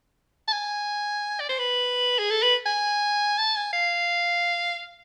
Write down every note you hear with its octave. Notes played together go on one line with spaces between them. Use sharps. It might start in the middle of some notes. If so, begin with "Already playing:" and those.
A5
G#5
D5
C5
B4
G#4
A4
B4
G#5
A5
G#5
F5